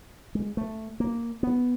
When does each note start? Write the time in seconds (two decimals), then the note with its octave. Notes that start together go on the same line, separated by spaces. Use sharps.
0.35 G#3
0.57 A3
1.00 A#3
1.43 B3